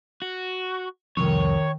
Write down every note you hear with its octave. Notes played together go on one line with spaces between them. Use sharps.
F#4
C2 F2 D#3 C#5